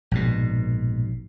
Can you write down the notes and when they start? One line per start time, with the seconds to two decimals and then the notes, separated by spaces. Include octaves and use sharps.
0.11 A#1 G#2 B2